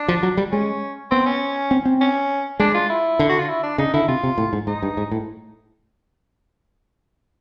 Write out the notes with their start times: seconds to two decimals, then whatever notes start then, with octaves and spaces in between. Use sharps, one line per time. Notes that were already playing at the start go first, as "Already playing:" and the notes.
Already playing: D4
0.08 F3
0.23 F#3
0.37 G3
0.52 G#3 C#4
1.11 B3 C4
1.26 C#4
1.71 C4
1.85 C4
2.01 C#4
2.60 G#3 D4
2.75 F4
2.90 E4
3.19 D3
3.29 F#4
3.39 F4
3.49 E4
3.64 D4
3.78 C#3 D#4
3.94 D3 E4
4.08 C3 F4
4.24 C3
4.38 A2
4.53 G#2
4.67 G#2 D#4
4.83 G2
4.97 G#2
5.11 A2